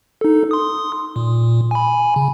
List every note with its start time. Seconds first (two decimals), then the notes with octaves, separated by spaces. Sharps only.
0.21 D#4 A4
0.51 C6 D#6
1.16 A#2
1.71 G#5 B5
2.16 C#3